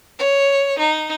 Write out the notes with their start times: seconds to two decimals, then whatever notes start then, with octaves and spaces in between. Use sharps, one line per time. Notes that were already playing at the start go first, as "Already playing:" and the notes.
0.19 C#5
0.78 D#4